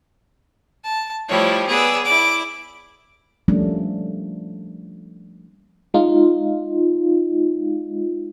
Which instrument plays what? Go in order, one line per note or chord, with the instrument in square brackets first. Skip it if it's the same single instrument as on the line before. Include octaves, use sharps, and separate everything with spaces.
[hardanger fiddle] A5
[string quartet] F3 G3 A3 [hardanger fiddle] E4 C#5
[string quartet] B3 D5 E6 [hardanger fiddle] G#4 B4
[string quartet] E4 D5 [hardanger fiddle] D6
[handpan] F3 G3 A3 A#3 C#4 D4
[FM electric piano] G#3 D#4 F4